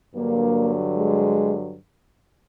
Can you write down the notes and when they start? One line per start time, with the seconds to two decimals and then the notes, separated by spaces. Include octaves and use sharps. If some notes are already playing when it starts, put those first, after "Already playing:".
0.14 G2 D3 F#3 A#3
0.96 G#3